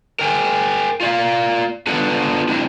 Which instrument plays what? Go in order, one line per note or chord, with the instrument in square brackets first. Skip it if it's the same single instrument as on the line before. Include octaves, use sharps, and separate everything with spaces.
[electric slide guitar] A#4 G5 G#5
F4 D5 F5
B3 D4 F4 A4 B4 F#5
C4 D4 E4 F#4